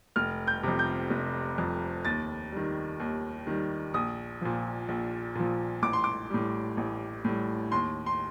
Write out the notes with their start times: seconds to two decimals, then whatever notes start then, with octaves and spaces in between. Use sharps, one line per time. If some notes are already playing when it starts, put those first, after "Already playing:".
0.16 F1 F6
0.48 G6
0.63 F2 C3
0.79 G6
1.10 F1
1.58 F2 C3
2.05 D#2 A6
2.52 D#3 G3
3.00 D#2
3.47 D#3 G3
3.94 A#1 D#6
4.41 A#2 F3
4.88 A#1
5.35 A#2 F3
5.82 A1 D6
5.93 C6
6.04 D6
6.30 A2 G3
6.77 A1
7.25 A2 G3
7.72 D#2 C6
8.06 C6